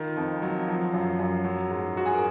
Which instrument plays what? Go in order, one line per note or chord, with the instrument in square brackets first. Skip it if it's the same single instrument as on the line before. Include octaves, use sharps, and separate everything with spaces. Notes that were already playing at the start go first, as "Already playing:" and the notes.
Already playing: [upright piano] D#3 F4
F2
F#3
F3
F#2
F#2
F#3
G#2
G#2 F#4
G#4
A#4